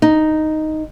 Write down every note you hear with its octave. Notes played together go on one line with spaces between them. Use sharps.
D#4